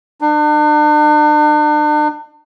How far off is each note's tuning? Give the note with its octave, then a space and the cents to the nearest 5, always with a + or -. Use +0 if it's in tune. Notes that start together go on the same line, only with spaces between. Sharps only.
D4 +40